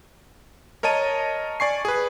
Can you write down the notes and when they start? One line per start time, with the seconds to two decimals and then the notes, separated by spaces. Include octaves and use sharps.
0.83 A#4 C#5 D#5 A5 D#7
1.60 D5 G#5 C#6 C7
1.85 G#4 B4